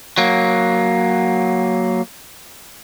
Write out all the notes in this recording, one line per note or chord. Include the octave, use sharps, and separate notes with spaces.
F#3 A#3